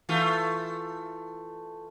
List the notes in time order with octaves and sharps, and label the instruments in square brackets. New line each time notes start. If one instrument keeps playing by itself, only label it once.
[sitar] E3 A3 F4